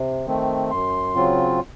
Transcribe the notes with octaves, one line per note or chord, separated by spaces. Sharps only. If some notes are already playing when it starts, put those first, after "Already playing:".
Already playing: C3
D#3 A3 C4
F#2 C6
C#3 F#3 C4 F4